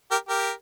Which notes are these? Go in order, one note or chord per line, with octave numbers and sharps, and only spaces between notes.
G4 A#4
G4 A#4